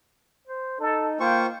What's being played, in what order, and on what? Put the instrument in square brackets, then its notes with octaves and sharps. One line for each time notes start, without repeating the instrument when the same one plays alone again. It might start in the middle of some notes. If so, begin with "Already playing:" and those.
[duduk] C5
[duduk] D#4 [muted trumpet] A4
[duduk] A#3 [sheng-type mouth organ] F4 C5 C#6 [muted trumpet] G5